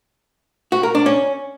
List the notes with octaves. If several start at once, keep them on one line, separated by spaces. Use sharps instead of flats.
F#4
A#4
D4
C#4